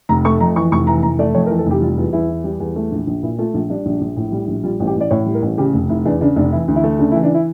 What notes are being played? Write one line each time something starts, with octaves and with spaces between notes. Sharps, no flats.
F1 A#5
A3 C#6
F2 A#5
E3 C#6
F1 C#6
E3 A#5
F1 A#5
A3 D5
F2 C#5
A#4
E3
A4
F1 G4
G3 F4
E2 F4
E2 E4
E3
G3
E2
A3
A#1
A#1
A#2 E4
A3 F4
A#1 F4
G3 D4
A#1
A#1
A2
G3
A#1
G3 F4
A1
G4
A1
D5
A2 C#5
G3
A#4
A1
C#3 G4
F1
F1 E4
E2 D4
C#3 D4
F1 D4
E3 E4
D2
E4
A3
C#3 D4
E4
E3
D4
E4